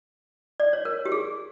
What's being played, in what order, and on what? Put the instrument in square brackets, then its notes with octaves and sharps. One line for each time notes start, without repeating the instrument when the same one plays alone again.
[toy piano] D5
C#5
A#4
G4
G#4